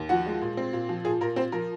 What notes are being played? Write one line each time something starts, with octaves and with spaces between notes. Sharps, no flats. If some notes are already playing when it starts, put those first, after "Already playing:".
Already playing: D#2
F3 F#4 F#5
G#3
A#2
C4
A#2
F3
A#2 G#4
A#2 A#4
C4 C5
F3 A#4